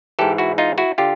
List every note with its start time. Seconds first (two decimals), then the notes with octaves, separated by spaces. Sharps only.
0.19 G#2 E3 G4 A4
0.38 E4 F#4
0.58 D#4 F4
0.78 E4 F#4
0.98 D3 F4 G4